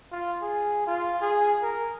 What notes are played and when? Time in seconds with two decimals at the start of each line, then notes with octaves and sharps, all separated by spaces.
0.12 F4
0.42 G#4
0.87 F4
1.22 G#4
1.63 A#4